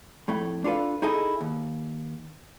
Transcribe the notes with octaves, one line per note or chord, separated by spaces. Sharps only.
F2 A2 A3
D4 F4 A4 B4 F5
D#4 E4 G#4 A4 D#5
D#2